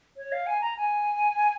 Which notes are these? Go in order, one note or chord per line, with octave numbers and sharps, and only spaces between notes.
C#5
F5
G#5
A#5
G#5